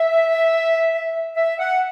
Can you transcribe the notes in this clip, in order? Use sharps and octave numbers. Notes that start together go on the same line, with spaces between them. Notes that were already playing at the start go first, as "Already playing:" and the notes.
Already playing: E5
E5
F#5